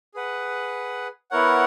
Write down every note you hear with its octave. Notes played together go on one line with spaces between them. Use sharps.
G#4 B4 F#5
B3 E4 A#4 C#5 F#5